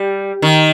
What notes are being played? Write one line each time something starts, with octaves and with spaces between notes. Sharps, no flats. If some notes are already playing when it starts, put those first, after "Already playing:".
Already playing: G3
D#3